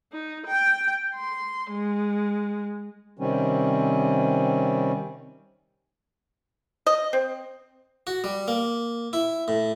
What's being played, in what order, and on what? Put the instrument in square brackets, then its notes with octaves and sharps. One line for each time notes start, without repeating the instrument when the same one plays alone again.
[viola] D#4
G5
C6
G#3
[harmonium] C3 D#3 G3 C4 C#4
[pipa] D#5
C4
[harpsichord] F#4
G3
A#3
E4
A2